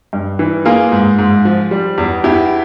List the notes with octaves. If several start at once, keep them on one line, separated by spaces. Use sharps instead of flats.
G2
E3
A#3 F4 G#4
G#2
G#2
F3
G3
E2
E2 E4 G4